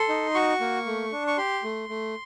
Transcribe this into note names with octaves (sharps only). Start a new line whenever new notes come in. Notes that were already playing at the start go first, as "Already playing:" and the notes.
Already playing: A4 C6
D#4
F#4 C#6
A#3
A3
D4
C#6
G4 C6
A3
A3